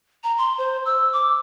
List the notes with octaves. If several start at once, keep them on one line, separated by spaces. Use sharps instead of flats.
A#5
C6
C5
E6
D6